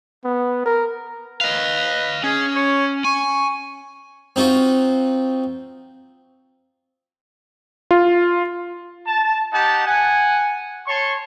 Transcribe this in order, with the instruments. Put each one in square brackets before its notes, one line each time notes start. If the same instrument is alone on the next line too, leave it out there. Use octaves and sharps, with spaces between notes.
[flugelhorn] B3
A#4
[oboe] B4 [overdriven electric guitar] D#5 F5
[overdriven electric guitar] C#4 [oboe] G#4
[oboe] C#5
[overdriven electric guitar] G#5 [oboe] C#6
[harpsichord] C4 D#4 F4 F#4
[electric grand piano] F4
[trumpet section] A5
D#4 G4 F#5 A5
F#5 G#5
C#5 A5 C6 C#6